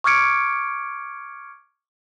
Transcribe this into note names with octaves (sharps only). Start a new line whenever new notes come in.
C#6 D6 F6 G#6 C#7 D7